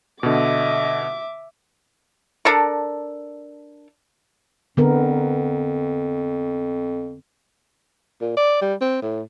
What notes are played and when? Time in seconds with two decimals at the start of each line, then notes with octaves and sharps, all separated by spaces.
0.23 B2 D3 D#5 E5 D6
2.45 D4 A4 A#4
4.77 F2 D3 B3 A#4
8.21 A#2
8.37 D5
8.62 G3
8.81 C4
9.02 A2